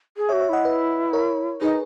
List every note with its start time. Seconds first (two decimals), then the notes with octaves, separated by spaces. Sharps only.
0.17 G#4
0.29 C#5 E5
0.33 F#4
0.41 C#5 E5
0.49 E4 D#5 F#5
0.65 B4 D#5
1.13 A#4 C#5
1.61 D#4 G#4 B4